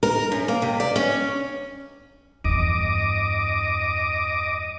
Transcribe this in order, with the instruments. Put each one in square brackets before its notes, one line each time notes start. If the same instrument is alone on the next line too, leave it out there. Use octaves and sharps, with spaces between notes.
[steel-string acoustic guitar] A#4
F#2
A#3
C3
D5
C#4
[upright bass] E2 G2 [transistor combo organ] D#5 D6